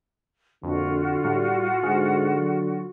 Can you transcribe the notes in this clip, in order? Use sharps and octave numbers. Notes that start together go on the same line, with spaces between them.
A#1 F2 D3 F4 F#4
A2 G3
G#2 D3 G#4
F#3